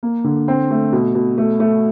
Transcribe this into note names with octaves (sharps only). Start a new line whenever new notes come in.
A#3
D3
C4
A3
B2
B2
A3
A3